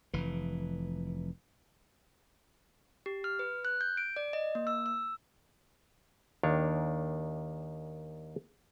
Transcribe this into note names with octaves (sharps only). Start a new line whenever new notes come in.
F1 E3
G4
F6
B4
F#6
G6
D7
D5
D#5
A#3
E6
E6
D#2 D#3 D4 C#5